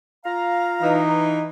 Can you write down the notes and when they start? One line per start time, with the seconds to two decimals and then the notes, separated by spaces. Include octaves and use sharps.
0.25 F4 F5 A#5
0.81 E3 D#4